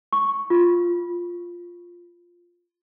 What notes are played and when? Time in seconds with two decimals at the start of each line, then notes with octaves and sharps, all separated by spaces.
0.13 C#6
0.50 F4